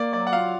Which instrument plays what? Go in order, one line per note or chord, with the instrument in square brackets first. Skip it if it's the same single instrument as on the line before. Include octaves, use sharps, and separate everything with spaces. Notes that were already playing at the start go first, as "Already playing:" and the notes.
Already playing: [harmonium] A#3 [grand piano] D5
[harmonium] F#3 [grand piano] D5
[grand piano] F#5
[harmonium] F4 [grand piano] F5